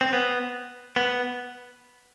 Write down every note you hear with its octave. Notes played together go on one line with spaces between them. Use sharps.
C4
B3
B3